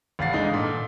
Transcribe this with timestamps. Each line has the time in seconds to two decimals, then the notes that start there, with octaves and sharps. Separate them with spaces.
0.19 F1 E2 F5 F#5 A6 C7
0.33 D3 E3 G#3 D#4
0.54 A#2 A4